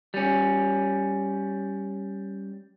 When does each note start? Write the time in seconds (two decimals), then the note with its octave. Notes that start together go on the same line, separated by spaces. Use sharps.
0.14 G3 C#4